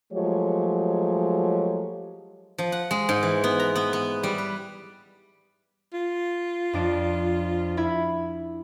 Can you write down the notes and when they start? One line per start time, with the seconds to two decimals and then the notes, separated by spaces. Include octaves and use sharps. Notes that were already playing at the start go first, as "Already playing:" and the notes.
0.13 F3 F#3 G#3 A3 G4 C#5
2.58 F3
2.72 F#5
2.91 G#3
3.09 G#2
3.23 E3
3.44 B3
3.60 A#5
3.76 B3
3.93 B3
4.23 G3
4.38 B4
5.93 F4
6.73 F2 D4 D7
7.77 E4 B5 G#6